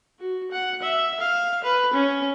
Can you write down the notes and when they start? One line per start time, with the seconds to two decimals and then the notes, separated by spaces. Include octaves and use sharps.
0.20 F#4
0.51 F#5
0.82 E5
1.20 F5
1.64 B4
1.93 C#4